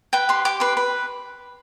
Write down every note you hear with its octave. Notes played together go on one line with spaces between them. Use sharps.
B4 G5
G4 C6
G4 D6
B4 C6
B4